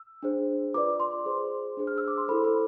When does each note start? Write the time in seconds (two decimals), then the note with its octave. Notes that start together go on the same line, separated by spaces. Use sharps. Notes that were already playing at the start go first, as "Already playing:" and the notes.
Already playing: E6
0.23 D4 G#4 C5
0.74 F4 B4 D5 D6
1.00 C6
1.26 G#4 C5
1.77 D4 G#4 C5
1.87 F6
1.98 E6
2.08 D6
2.18 C6
2.28 E4 A4 C5 B5
2.44 B5